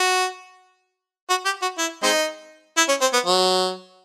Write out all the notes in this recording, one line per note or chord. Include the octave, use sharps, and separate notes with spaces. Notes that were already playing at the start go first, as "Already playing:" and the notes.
Already playing: F#4
F#4
G4
F#4
E4
G#3 C4 D#4
E4
C#4
C4
B3
F#3